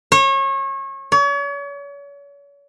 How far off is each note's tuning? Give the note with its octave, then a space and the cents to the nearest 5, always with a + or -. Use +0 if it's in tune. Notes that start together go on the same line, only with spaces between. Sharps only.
C#5 -30
C#5 +40